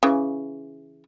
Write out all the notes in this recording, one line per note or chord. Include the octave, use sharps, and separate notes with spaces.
C#3 E3